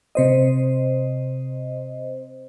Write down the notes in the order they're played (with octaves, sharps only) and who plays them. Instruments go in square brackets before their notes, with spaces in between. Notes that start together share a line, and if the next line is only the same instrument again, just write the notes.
[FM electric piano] C3 C5 D#5